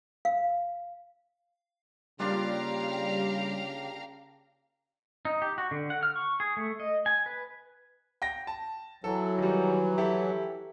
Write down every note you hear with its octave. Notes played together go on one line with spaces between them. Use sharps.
F5
C#3 G3 A#3 D4 F4 G4 F5 A#5
D#4
G4
F#4
D3
F#5
F6
C#6
G#4
A3
D#5
G#5
B4
G5 A#6
A5
E3 F#3 A4
D#3 G3
E4 G4 A4